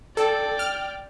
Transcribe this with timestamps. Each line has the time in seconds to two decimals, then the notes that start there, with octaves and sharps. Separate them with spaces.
0.17 A4 D5 G5
0.59 F6